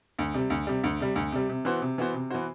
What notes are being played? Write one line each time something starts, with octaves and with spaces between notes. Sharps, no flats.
D2
C3 G3
D2
C3 G3
D2
C3 G3
D2
C3 G3
C3
E3 B3 F#4 C5
C3
E3 B3 F#4 C5
C3
E3 B3 F#4 C5